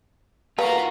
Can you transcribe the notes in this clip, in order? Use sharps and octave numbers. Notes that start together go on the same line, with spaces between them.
A#3 F4 F#4 B4 A#5